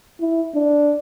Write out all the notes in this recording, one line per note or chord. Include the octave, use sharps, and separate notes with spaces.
E4
D4